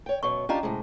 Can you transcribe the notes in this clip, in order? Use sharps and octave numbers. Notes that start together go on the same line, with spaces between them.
C#5 G5
F#2 B2 F#3 C#6
C#4 D4 F4 G4 D#5 A#5
A2 C3 G#3